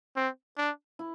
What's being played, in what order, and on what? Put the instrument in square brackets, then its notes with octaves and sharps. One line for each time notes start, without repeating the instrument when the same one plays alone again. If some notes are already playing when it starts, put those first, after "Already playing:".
[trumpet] C4
D4
[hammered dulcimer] E4